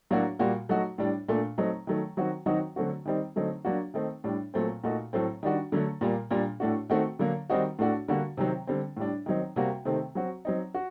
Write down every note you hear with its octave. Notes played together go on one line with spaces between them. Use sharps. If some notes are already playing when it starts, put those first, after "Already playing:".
A2 F#3 A#3 D4 F#4
A#2 G3 A#3 F#4
F#3 A3 D#4 F#4
A2 G3 D4
A#2 A3 D4
F#3 A3 C4 D#4
D#3 F#3 A3
D#3 F#3 C4 F#4
D#3 F#3 C4 D#4 F#4
D3 F#3 A3 C4 F#4
D#3 G3 C4 D#4
D3 F#3 A3 C4 D#4
F#3 A#3 D4 F#4
D#3 A3 C4 D#4
A2 G3 D4
A#2 F#3 A3 C4
A#2 A3 D#4 F#4
A2 F#3 A3 C4
D#3 G3 D4 F#4
D3 F#3 A3
A#2 G3 A#3
A#2 G3 A#3 D4
A2 A3 D4 F#4
D#3 A3 C4 F#4
D3 F#3 A#3
D#3 G3 C4 D#4 F#4
A2 A3 D4 F#4
D3 G3 A#3 F#4
C3 D#3 F#3 C4
D3 G3 C4
A2 G3 D4
D#3 F#3 C4 D#4
C3 G3 A#3 F#4
C3 D#3 A3 C4
F#3 C4 F#4
F#3 C4 D#4
F#4